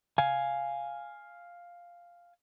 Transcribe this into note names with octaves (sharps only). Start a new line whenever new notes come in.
F5 G#5